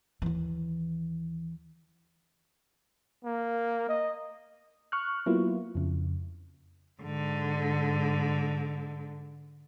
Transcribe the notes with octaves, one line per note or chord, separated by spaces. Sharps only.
D#2 E3
A#3
D#5
C#6 F6 F#6
F#3 A#3 B3 E4 F4
F2 C#3
G#2 D3